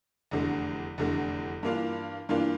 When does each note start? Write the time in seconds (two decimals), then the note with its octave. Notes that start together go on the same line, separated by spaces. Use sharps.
0.31 F1 E2 D3 A3
0.98 F1 E2 D3 A3
1.63 G2 E3 A#3 D4 F4
2.29 G2 E3 A#3 D4 F4